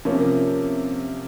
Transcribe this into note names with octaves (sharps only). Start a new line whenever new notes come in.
C3 F3 A#3 C#4